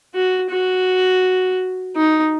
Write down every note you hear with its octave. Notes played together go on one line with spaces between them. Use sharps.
F#4
F#4
D#4